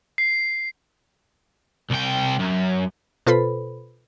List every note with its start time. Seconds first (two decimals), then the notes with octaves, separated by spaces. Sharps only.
0.18 C7
1.90 C2 G5
2.39 F#2
3.27 B2 F4 A4 B4 C5 B5